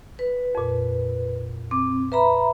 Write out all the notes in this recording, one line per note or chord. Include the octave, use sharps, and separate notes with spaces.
B4
F2 A#2
C4 D6
B4 E5 A#5 B5